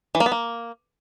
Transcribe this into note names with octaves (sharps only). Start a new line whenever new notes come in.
E3
A#3
B3
A#3